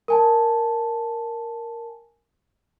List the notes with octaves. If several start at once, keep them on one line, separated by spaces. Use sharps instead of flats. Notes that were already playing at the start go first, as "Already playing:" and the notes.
A#4 G#5 A5